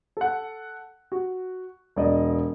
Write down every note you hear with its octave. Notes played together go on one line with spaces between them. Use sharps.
A4 F#5
F#4
E1 D5 D#5